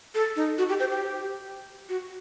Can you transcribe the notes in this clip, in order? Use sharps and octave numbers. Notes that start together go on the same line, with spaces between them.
A4
D#4
F#4
G4
C5
G4
F#4